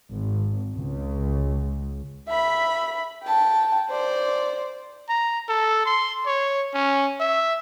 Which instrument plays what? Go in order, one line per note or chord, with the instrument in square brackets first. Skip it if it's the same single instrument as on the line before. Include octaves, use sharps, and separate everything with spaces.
[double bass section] G#1
C#2
[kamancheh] E5 B5
G5 A5
C5 D5
[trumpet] A#5
A4
C6
C#5
C#4
E5